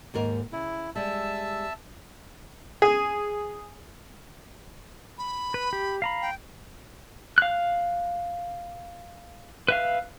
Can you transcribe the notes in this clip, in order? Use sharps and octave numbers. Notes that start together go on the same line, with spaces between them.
D#2 G#2 A#4
C#3 E4
G3 G#3 E5 A5 E6
G#4
B5
B4
G4
F5 A#5 B5
G5
F5 F#6
B4 E5 F5